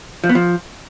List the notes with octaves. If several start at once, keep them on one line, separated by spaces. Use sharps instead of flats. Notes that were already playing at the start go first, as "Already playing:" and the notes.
F3
B3
F3